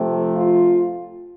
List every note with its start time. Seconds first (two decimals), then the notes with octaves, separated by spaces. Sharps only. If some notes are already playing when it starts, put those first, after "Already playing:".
Already playing: C3 F3 A3 C4
0.36 F4